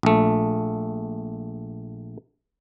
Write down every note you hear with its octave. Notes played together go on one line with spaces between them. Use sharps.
A#1 A3